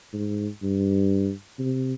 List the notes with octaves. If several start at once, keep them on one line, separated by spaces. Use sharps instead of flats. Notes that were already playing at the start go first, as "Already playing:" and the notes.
G#2
G2
C3